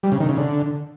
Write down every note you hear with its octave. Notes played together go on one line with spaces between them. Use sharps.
G3
C#3
D#3
C#3
D3